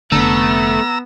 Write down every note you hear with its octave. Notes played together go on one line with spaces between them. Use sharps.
F1 D3 A3 B3 A#5 E6